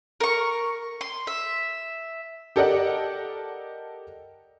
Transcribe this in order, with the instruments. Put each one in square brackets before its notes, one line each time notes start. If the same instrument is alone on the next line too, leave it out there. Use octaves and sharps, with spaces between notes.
[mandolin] A#4 C#6
C6
E5
[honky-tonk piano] G4 A4 A#4 D5 D#5 F#5